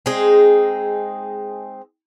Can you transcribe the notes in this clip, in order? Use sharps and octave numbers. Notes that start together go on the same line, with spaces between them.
G#3 C4 D#4 G#4